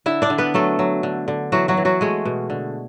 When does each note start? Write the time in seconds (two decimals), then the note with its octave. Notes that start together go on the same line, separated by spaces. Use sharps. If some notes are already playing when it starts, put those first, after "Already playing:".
0.06 D3 E4 E5
0.22 D4 D5
0.30 D3
0.38 B3 B4
0.54 F#3 A3 A4
0.79 F#3
1.03 D3
1.28 D3
1.52 E3 F#3 F#4
1.68 F#3 F#4
1.77 E3
1.85 F#3 F#4
2.01 G#3 A3 G#4
2.25 B2
2.50 D3